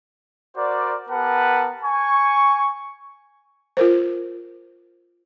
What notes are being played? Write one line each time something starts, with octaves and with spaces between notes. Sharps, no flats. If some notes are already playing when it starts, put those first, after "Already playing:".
F#4 A#4 C5 D5
B3 G4 A#4 B4 F#5 A5
G#5 C#6
F4 A#4 C5